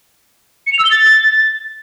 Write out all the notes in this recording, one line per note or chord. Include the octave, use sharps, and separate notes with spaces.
C#7
F7
E6
G7
A6